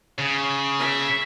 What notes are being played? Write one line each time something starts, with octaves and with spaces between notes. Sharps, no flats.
C#3
E5